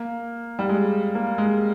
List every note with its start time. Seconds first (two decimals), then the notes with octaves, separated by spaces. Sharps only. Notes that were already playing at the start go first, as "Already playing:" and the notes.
Already playing: A#3
0.59 G3
0.69 G#3
1.15 A#3
1.38 G#3